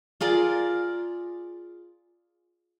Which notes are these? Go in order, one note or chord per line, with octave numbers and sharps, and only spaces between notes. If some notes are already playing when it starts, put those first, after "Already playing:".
F4 G#4 A#4 D5